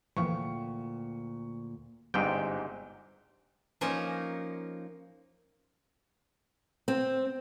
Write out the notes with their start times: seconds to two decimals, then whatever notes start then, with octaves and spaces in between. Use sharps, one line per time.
0.17 D2 A#2 E3 F3 G5 C#6
2.14 G1 G#2 C3 G5
3.81 F3 A#3 C#4 D#4
6.88 C4